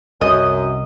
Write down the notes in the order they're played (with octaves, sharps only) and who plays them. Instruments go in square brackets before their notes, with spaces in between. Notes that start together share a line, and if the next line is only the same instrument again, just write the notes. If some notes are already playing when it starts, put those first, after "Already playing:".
[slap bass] C2 [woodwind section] F#2 [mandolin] D#5